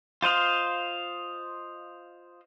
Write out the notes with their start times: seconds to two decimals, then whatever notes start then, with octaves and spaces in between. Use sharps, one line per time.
0.22 F4 C5 D#5 F5